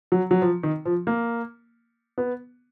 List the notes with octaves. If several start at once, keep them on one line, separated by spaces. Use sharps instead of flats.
F#3
F#3
F3
D#3
F3
A#3
B3